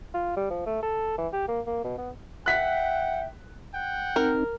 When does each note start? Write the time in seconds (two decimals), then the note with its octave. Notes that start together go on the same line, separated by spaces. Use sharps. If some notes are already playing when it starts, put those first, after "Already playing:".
0.14 F4
0.37 G3
0.51 F3
0.66 A3
0.83 A4
1.18 E3
1.33 G4
1.48 A#3
1.67 A#3
1.84 B2
1.98 B3
2.46 E5 F#5 G5 F#6 B6
3.74 F#5 G5
4.16 C4 D#4 A#4